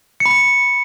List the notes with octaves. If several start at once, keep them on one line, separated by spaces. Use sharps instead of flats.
C#7
B5
C#7